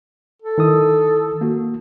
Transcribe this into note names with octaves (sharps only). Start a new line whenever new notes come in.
A4
D#3 E4 D#6
A#3 F#4